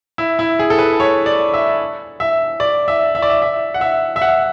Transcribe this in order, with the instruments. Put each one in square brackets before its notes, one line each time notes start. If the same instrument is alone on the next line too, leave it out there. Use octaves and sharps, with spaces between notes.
[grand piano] E4
E4
G#4
A4
B4
C#5
D5
E5
E5
D5
E5
E5
D5
E5
E5
F#5
E5
E5
F#5